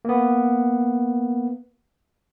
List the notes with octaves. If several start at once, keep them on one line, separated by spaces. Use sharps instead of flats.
A#3 B3